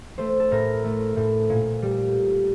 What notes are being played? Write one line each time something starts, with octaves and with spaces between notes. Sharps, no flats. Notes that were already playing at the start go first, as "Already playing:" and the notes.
A3 C5
A4
A2 A#4
A3
A2
A#2
G3